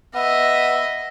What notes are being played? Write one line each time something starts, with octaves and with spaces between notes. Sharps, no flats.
B3 D#5 E5